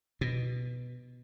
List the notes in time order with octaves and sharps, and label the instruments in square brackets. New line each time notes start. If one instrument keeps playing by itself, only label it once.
[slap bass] B2